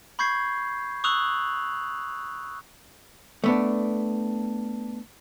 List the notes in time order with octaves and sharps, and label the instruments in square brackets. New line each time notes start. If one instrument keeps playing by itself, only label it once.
[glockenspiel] B5 C#6 G6 G#6 C7
C#6 D#6 E6 F#6 F7 F#7
[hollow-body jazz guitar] A3 B3 D4